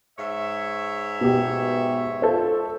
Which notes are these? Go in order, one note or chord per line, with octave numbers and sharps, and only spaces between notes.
G#2 C#5 E5
B2 G4
F4 A4 C5